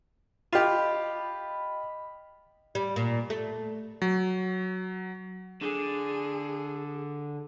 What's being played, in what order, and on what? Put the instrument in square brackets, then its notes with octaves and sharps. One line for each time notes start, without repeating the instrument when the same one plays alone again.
[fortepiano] F4 G4 [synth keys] D#5 B5
[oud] G3
A#2
A3
[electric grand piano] F#3
[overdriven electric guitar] D3 [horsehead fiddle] G#4